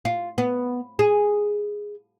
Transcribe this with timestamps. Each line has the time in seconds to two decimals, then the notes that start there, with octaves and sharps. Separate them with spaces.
0.05 F4
0.38 B3
0.99 G#4